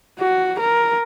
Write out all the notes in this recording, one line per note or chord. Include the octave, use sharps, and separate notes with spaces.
F#4
A#4